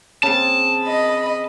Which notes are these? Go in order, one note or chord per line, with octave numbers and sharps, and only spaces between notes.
C#3 C4 A5
D#5 B5